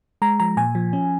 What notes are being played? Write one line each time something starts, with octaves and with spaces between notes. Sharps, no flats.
G#3 A#5
F3 A#5
A#2 G#5
F3
C#4